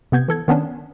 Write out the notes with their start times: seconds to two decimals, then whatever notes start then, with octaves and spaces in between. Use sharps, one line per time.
0.12 C3 B3 G6 G#6
0.28 E3 A4 G#6
0.48 D#3 B3 C#4 D4